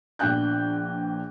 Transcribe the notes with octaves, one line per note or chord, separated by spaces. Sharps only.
A#1 B3 D4 G5 F#6 G6